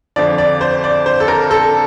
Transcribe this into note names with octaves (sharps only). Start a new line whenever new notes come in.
F2 D3 F3 D5
D5
C5
D5
C5
A4
A#4
A4